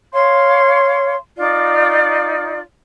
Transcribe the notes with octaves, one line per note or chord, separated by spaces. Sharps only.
C#5 F5 C6
D#4 F4 D5